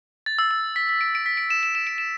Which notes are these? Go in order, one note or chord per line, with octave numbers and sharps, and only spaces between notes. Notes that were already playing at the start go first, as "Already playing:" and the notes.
A6
E6
E6
B6
B6
D7
D7
B6
D7
E7
E7
E7
D7
E7